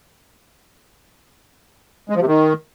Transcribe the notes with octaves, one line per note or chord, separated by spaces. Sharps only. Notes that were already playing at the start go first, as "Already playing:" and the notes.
G#3
F3
C3
D#3